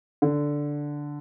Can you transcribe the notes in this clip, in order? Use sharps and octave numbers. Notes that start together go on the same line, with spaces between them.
D3